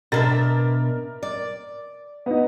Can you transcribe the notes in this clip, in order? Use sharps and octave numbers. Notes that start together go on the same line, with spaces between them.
B2 D4 A#4 E5 A6
D5
B3 D#4